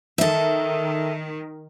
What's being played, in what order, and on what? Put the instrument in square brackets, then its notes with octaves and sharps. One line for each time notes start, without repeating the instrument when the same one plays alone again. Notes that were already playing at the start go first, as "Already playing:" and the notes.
[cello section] D#3 [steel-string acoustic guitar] A4 E5